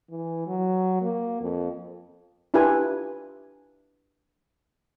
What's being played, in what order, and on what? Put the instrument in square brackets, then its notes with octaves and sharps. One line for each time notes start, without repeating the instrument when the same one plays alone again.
[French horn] E3
F#3
A#3
F2
[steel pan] D4 E4 F4 G4 B4 G#5